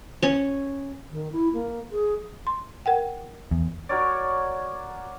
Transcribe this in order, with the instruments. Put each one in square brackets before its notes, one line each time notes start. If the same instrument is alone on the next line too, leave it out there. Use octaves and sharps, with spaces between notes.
[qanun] C#4 C#5
[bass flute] D#3
E4
A#3
G#4
[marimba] C6
A#4 F#5 G5
[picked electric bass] E2
[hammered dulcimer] F#4 A#4 C#5 D5